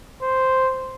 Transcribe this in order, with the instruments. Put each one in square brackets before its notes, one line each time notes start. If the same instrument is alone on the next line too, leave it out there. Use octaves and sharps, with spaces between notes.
[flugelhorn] C5